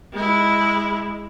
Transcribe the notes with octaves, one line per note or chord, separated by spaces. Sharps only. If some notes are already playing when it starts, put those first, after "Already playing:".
G#3 E4